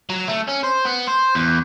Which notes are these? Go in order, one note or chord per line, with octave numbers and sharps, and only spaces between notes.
F#3
A3
C#4
C5
B3
C5
E2